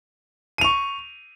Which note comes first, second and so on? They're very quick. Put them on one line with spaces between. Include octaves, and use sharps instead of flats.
D#7 F7 C#6